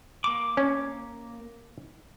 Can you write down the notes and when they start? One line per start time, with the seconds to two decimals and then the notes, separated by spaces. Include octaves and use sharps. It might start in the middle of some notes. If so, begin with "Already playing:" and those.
0.24 A#3 D6
0.57 C#4